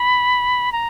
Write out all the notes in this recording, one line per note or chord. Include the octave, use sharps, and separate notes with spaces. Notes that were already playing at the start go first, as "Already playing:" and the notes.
Already playing: B5
A#5